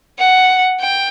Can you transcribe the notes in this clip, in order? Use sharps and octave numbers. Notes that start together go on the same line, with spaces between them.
F#5
G5